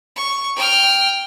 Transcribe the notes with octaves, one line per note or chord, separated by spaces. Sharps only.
C#6
G5 F6